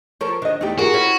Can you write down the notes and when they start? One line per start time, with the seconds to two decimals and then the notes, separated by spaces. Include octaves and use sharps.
0.21 F3 A4 A#4 C#5
0.42 D#3 D4 D#5
0.61 E2 A3 D#4 G4
0.79 F4 F#4 G#4 A#4
0.94 C#4 E4 B4